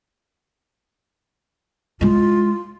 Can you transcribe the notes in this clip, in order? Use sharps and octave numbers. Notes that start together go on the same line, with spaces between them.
G#3 E4 F4